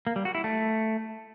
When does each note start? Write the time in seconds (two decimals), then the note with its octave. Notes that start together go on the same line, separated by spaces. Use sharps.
0.07 A#3
0.16 G3
0.25 F#4
0.35 E4
0.44 A3